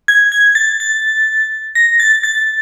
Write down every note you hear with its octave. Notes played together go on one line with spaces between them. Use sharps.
G#6
G#6
A6
A6
A#6
A6
A6